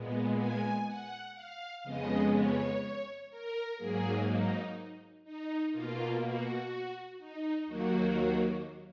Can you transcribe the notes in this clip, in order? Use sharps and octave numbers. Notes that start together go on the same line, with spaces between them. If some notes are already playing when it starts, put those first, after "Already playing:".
Already playing: A#2 G#3 B3
G#5
F#5
F5
F2 C#3 G#3 B3 D#5
C#5
A#4
G#2 F#3 A#3 G#4
D#4
D#4
B2 A#3 F4
F#4
D#4
D#2 D#3 F#3 A#3 F#4